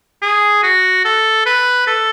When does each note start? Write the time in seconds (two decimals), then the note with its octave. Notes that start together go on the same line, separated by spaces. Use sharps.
0.22 G#4
0.63 F#4
1.05 A4
1.46 B4
1.87 A4